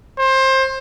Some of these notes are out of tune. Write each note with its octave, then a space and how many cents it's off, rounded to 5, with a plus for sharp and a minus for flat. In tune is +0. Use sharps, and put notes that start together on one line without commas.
C5 +20